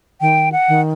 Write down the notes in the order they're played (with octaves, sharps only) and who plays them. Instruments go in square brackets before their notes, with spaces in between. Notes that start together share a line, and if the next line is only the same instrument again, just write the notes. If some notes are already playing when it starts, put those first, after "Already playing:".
[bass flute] D#3 [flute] G5
[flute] F#5
[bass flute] D#3